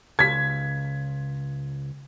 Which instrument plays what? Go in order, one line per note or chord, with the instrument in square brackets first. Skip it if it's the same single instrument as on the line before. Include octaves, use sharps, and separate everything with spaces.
[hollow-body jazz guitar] C#2 [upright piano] G#6 B6